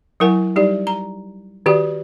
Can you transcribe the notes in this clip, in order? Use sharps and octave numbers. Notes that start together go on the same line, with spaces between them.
F#3 E4 A#4 F#5 G#5
G3 D#4 G4 D5
A#5
D#3 F#4 G4 D5